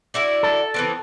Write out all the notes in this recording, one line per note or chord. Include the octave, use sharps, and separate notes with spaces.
D4 E4 F#4
A4
E3 B3 C4